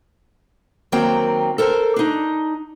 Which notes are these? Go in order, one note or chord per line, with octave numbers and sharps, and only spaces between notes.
D#3 F#3 A#3 C4 G5
A4 A#4 C5
D4 D#4